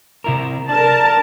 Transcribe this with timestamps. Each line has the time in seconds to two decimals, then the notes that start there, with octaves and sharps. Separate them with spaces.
0.24 C3 E4 A#4
0.69 D4 A#4 A5